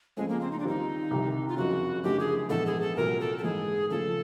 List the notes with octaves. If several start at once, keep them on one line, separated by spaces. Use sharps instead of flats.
C#2 C#3 F3 G#3 A3 C4
A#3
C4
D#4
D4
D#2 D#3 G3 C4 D#4 F4
C2 C3 D#3
F4
F#1 F2 C#3 F#4
F#1 F#2 D3 F3 A3 G4
G#4
A#1 G#2 E3 G#3 B3 A4
G#4
A4
C2 A#2 F#3 A#4
A4
A4
G#2 E3 G#3 G#4
E2 C#3 F3 A3 A4